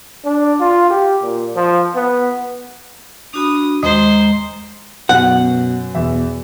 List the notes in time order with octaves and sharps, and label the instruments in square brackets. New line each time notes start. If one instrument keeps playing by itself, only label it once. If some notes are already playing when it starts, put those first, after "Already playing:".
[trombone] D4
F4
G4
A#2
F3
B3
[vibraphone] D4 F#4 B5 [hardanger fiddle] D#6
[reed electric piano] D#2 D#5 D#6 [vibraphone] G#3 A#5 [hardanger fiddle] C5
[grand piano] F#2 [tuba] B2 [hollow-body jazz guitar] F#5
[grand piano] E2 E5 [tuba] B2